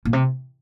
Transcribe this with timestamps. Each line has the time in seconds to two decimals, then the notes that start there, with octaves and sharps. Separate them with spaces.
0.05 A#2
0.13 C3